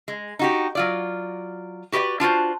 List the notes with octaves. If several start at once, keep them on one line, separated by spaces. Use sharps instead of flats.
G#3
D#4 F#4 G4
F#3 F4 D5
F#4 G4 B4 C5 D5
D4 F4 F#4 C5